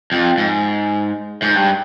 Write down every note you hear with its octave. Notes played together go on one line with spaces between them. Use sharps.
F2
G#2
G#2
G2